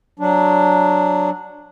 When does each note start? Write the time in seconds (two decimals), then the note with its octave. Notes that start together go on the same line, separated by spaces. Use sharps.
0.19 F#3 D4